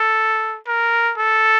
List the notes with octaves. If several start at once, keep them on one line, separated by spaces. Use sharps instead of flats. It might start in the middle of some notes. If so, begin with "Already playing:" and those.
Already playing: A4
A#4
A4